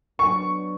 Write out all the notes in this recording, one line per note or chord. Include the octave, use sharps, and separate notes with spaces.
F#3 B3 D4 C#6